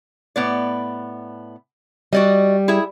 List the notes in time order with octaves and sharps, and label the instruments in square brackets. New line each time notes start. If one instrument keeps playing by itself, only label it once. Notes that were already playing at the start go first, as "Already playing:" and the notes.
[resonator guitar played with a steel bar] A2 B3 D5
[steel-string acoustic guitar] G3 [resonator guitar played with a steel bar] F#4 D5 D#5
[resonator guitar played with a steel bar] E4 G#4 E5